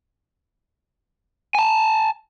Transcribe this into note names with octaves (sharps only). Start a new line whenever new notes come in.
G#5 A5